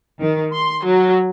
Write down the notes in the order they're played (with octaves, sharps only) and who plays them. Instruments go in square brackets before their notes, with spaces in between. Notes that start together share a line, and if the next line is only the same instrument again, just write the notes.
[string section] D#3
C6
F#3